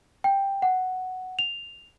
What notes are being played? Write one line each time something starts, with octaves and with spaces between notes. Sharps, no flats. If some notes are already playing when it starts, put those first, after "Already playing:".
G5
F#5
F7